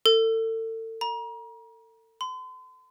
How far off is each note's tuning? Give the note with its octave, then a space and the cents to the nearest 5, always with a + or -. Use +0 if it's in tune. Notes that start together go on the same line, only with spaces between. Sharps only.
A4 +40
A#5 +35
C6 -40